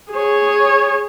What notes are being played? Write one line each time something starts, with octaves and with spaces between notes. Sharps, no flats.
G#4 C#5